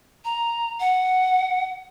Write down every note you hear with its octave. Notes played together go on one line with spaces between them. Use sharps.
A#5
F#5